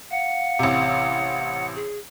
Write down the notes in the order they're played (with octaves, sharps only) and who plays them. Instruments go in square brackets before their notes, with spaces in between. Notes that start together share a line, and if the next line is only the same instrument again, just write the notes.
[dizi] F5 [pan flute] F#5
[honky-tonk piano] A1 C3
[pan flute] G#4